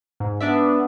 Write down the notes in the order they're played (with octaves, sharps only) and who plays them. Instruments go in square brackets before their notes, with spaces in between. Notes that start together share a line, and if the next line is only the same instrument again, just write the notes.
[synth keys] G#2
[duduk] B3 [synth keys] D4 D5 E5